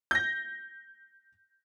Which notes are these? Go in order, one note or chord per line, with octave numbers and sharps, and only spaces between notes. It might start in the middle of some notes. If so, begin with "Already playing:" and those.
G6 A#6